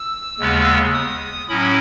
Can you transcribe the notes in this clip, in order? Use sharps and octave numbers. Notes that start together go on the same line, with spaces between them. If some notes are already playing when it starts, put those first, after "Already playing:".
Already playing: E6
D#2 C#3 G#3 B3
D#6
A2 F#3 C#4 E4 B5